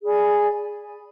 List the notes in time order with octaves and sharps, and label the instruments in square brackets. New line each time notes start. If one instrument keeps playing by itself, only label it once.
[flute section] G#4 D5 G#5 B5